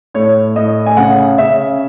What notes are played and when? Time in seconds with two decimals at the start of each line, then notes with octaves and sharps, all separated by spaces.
0.14 A2 C#5
0.56 A2 D#5
0.86 G#5
0.97 C#3 F#5
1.38 C#3 E5